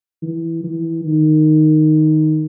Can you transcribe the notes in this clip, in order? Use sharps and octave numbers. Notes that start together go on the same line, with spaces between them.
E3
E3
D#3